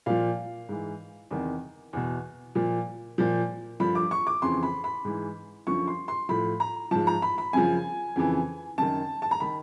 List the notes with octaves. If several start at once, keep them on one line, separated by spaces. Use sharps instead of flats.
A#2 F3 F5
G#2 E3
E2 C3 D#3
E2 B2
A#2 F3
A#2 F3
G2 D3 F3 B5
D6
C#6
D6
F2 C#3 E3 C6
B5
B5
G#2 E3
F#2 D3 F3 C#6
C6
C6
A2 F3 B5
A#5
G#2 F3 A5
A#5
B5
B5
F#2 C#3 F3 G#5
F2 C#3 E3
F#2 D#3 A5
A5
A#5
D#3 B5